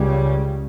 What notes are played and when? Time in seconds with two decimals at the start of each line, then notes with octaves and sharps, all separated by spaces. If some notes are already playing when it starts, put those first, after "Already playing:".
Already playing: C#2 C#3 G3